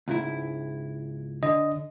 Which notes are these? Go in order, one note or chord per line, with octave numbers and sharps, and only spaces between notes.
C#2 G#2 E4
D3 D#5